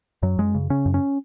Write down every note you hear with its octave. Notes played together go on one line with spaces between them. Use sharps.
F#2 F#3
F#2 G#3
C#3
C#3 C#4
F#2
C#4